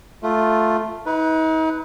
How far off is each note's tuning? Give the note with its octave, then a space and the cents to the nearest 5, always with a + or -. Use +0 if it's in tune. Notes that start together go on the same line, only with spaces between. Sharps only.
A3 +0 F4 +0
D#4 +40 B4 +0